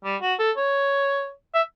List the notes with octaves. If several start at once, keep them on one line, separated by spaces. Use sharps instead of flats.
G3
F#4
A4
C#5
E5